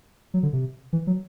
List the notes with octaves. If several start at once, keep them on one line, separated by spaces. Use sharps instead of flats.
F#3
D3
C3
E3
F#3